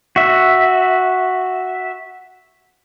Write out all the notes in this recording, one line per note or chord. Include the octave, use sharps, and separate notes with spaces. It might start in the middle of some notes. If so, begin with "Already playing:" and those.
F#4 E5